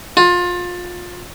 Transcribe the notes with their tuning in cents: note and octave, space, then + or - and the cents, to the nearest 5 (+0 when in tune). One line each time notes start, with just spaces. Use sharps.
F4 +25